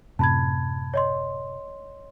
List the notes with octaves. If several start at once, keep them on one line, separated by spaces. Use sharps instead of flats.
F#2 A2 C3 A5 B5 G#6
C#5 D#5 C6